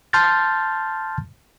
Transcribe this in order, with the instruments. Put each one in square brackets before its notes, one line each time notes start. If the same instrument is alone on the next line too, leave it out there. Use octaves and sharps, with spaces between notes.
[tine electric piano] A5 C6 F6 G6 A6